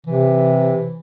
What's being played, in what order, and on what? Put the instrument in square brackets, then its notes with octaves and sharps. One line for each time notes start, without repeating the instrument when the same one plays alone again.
[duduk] C3 [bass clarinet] E3